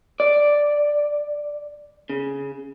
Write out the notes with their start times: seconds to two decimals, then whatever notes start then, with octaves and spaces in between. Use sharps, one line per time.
0.20 D5
2.10 C#3